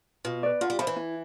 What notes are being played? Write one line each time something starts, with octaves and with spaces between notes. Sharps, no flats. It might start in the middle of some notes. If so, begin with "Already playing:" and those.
B2 F4
B4 D5
D3 F4
G3
F3 C5 E5 B5
E3
E4